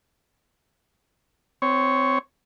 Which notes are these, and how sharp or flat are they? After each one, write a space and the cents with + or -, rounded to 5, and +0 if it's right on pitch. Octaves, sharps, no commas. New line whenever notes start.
C4 -20 C#5 +0